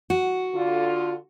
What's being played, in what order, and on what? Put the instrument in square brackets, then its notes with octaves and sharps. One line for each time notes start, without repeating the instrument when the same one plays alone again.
[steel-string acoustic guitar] F#4
[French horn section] D3 F4